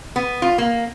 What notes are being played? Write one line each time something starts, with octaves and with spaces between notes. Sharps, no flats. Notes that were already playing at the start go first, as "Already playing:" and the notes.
B3
F4
A#3